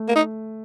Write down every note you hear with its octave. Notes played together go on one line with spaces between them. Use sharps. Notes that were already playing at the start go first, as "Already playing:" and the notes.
Already playing: A3
A#3
D#4